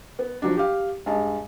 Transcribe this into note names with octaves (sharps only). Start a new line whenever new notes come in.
B3
F3 F#3 D4
G4 F5
G2 G#3 A5